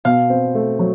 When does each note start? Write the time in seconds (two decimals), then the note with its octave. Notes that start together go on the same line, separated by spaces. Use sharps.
0.05 B2 F5
0.30 C4
0.55 A3
0.79 F#3